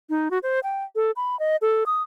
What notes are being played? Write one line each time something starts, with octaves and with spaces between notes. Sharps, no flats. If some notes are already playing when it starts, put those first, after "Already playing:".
D#4
F#4
C5
G5
A4
B5
D#5
A4
D#6